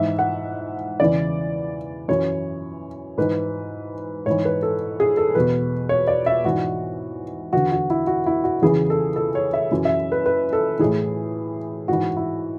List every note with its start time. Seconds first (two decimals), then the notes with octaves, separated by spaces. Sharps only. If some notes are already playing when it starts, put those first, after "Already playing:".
Already playing: G#2 E3 E5
0.19 F#5
1.00 E2 C#3 E3 D5
2.08 F#2 E3 C#5
3.18 G#2 E3 B4
4.26 G#2 E3 C#5
4.45 B4
4.63 A4
5.00 G#4
5.17 A4
5.35 E2 B2 B4
5.89 C#5
6.07 D5
6.26 E5
6.44 G#2 E3 F#4
7.53 E2 D3 F#4
7.72 F#4
7.90 E4
8.07 F#4
8.26 E4
8.44 F#4
8.62 E2 C#3 E3 G#4
8.90 A4
9.16 A4
9.35 C#5
9.53 E5
9.71 F#2 E3
9.85 E5
10.12 B4
10.26 B4
10.53 A4
10.79 A2 E3 G#4
11.88 G#2 E3 F#4
12.17 E4